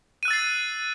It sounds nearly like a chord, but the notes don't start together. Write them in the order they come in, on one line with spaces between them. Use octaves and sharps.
D#7 F#6 E6 A6 C7